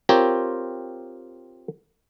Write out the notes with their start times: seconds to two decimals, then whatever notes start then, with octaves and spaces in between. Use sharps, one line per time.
0.09 C4 F4 G4 A#4 C#5